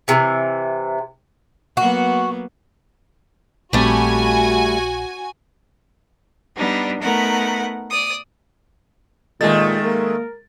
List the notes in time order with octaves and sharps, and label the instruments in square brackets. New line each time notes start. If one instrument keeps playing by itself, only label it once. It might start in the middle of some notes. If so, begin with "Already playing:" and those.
[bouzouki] C3 E3
[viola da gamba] F#3 A#3 B3 [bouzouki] F#4
[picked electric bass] A#1 C4 [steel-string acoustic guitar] G3 A3 E4 [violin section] F#4 G#5
[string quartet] G3 B3 D4 D#4
A3 B3 D#4 A#4 F#5
D5 D#6
[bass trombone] A#2 [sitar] D#3 A3 [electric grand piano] G#3 G#4 A6 [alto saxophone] D#5
[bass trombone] A#3 [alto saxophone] A#4